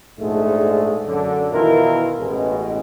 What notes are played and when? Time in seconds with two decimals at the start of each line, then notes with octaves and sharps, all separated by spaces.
0.19 A#1 G#2 G#3 A3
1.06 F#2 D3
1.52 B2 D#3 E3 E4 F4 A#4
2.18 A1 B2 G#3